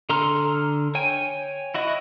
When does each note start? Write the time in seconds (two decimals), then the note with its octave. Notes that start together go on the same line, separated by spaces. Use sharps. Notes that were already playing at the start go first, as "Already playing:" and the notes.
0.09 D3 A4 A#5 C6 F6
0.95 C#5 G5 G#5
1.74 E4 F#4 D#5